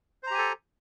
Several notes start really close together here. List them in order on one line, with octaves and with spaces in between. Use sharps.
C5 A#5 G4 G#5 A4